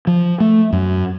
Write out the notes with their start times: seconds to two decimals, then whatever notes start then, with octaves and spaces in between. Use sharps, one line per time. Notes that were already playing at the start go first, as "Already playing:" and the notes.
0.07 F3
0.40 A3
0.73 F#2